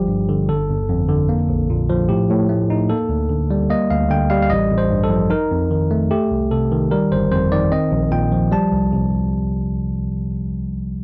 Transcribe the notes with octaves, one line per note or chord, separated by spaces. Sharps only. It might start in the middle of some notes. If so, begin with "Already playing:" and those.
Already playing: G1 F3 G3 G4
G2
D3
G1 A4
G1
F2
D3
A#3
A#1
A#2
F3
A2 G4
A2
A3
D#4
A#3 A4
D2
D3
G3
A#3 D#5
D2 F5
D3 G5
G3 F5
F5
A1 D#5
A1
C5
G2
A4
F3
D#4 A#4
F2
D#3
A3
A3 G4
C2
C3 A4
D#3
G3 A#4
G1 C5
F2 C5
D#3 D5
C4 D#5
A#1
A#2 G5
F3
G3 A5
C2
C3